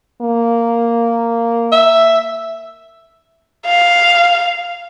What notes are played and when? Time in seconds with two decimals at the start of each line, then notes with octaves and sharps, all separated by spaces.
0.22 A#3
1.72 E5
3.66 F5